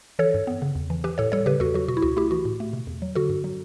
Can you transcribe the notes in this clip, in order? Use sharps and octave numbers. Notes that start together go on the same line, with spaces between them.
E3 A4 C#5
G2
B3
C#3
E2
E3
E3 G4 B4
A2 A4 C#5
G3 A4 C#5
C#3 G4 B4
E2 F#4 A4
F#3 F#4
B2 F#4
E4
C#2 F#4
A3 E4 G4
E3 F#4
A2
A3
B2
E2
F#3
D3 F#4 A4
G2
F#3